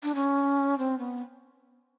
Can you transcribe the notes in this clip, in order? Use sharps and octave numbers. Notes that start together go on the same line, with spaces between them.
D4
C#4
C4
B3